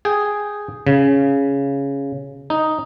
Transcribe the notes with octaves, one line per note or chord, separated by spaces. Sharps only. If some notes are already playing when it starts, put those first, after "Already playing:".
G#4 G5
C#3
D#4